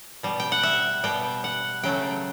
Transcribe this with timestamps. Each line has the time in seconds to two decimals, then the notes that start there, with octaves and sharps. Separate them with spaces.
0.23 B2 G3
0.40 G5
0.52 F#5
0.63 E5
1.03 B2 G3 G5
1.44 F#5
1.83 C#3 F#3 A3 G5